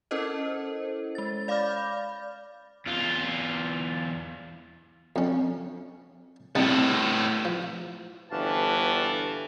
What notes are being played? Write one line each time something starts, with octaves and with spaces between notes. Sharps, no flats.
C#4 E4 A4 A#4 C5 D#5
G#3 A6
D5 F5 B5 D6 F6 G6
E2 F4
F2 C#4
C2 A2 B3 D#4 A5
F3
G1 E3 F#4 G4 F5 A5